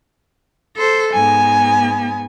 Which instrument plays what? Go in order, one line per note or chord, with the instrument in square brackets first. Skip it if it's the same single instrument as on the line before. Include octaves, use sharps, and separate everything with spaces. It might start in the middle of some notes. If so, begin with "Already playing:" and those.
[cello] A4 C5
[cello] G#2 B3 [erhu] G#5